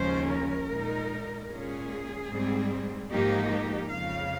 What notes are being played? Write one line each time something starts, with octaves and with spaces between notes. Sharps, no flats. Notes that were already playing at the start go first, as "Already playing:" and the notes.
Already playing: D#2 C#3 F3 G#3 C#4 C5
A#4
A#2 G#3 D#4
A#2 G#3 C#4 G#4
G#2 G3 C4
G#2 F3 A#3 D#4 G4
G4
F2 C#3 F3 F5